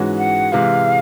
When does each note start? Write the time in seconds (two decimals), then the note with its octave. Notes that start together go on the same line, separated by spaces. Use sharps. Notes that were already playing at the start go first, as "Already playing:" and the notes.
Already playing: G#2 E3 G#3 C#4 F#4
0.18 F#5
0.52 C3 E3 G#3 F5